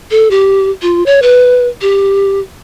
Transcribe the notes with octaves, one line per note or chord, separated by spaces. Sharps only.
A4
G4
F4
C#5
B4
G4